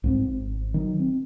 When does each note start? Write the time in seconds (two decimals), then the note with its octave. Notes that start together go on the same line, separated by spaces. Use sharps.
0.04 C2 G#2 C4
0.28 G#1
0.74 D#3 F3 F#3
0.99 C4